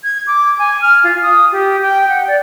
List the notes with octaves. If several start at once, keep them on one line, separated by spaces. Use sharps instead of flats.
G#6
D6
G#5
F6
F4
D#6
G4
G5
F#5
D5